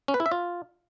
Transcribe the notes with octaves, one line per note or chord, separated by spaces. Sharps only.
C#4
B4
E4
E5
F4